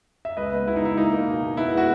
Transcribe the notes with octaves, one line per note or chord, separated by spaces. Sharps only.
E5
C#2 B4 D#5
B3
C#2 E4
D#4
C#2 E4
A#3 D#4
A#3
B2
B2
B3 E4
G#3 F#4